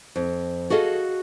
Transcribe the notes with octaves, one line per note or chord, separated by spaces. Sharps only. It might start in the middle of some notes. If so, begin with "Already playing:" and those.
F2
F#4 G#4 A4 D#5 F5